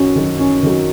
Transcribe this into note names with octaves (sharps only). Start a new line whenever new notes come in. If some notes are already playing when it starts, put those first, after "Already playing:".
Already playing: F#2 D#3 F#3 C#4 F#4
D#3 F#3
F#2 C#4
D#3 F#3